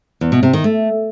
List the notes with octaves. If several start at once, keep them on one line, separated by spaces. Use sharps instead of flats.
E2
B2
C3
D#3
A3